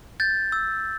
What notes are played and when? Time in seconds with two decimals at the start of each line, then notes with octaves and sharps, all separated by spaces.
0.20 G6 A6
0.52 E6